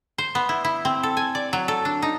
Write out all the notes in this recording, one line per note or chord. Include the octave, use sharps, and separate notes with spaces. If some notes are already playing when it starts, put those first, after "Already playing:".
C5
B3
E4
E4
C4
A4
G#5
D5
F#3
A4
D4
D#4